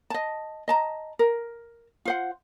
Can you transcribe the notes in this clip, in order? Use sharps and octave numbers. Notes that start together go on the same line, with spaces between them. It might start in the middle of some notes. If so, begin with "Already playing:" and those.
D#5 A5
D#5 A5 A#5
A#4
F4 C5 F#5